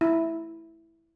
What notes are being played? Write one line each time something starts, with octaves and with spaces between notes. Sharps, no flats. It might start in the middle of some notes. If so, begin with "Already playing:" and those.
E4